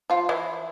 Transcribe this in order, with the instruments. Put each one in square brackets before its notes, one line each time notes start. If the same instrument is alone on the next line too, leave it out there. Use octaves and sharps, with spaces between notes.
[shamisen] F3 F4
E3 E4